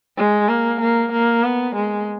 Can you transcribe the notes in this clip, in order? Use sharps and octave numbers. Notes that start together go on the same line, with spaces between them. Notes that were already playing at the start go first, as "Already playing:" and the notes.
G#3
A#3
A#3
A#3
B3
G#3